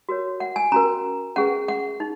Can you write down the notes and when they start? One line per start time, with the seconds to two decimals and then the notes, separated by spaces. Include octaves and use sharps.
0.09 F#4 A#4 C#5
0.40 F#5
0.56 G#5
0.72 C#4 F#4 A#4 A#5
1.36 C#4 G#4 B4 F#5
1.68 F#5
2.00 D#4